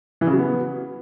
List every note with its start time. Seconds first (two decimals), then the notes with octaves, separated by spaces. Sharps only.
0.21 E3
0.27 C#3
0.33 F#3
0.38 B3